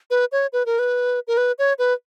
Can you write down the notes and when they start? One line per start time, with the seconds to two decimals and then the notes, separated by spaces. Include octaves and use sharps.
0.10 B4
0.32 C#5
0.53 B4
0.66 A#4
0.79 B4
1.28 A#4
1.37 B4
1.59 C#5
1.79 B4